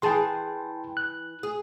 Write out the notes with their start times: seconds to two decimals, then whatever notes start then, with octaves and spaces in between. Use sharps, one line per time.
0.02 E3 G#4 G5 A5 C6
0.97 F#6
1.43 G#4